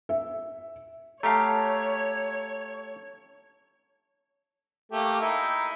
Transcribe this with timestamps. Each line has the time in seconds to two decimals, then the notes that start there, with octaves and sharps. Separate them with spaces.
0.09 E5
1.23 A3 G4 C#5 F5 A5 A#5
4.92 A3 A#3 G4
5.21 D#4 E4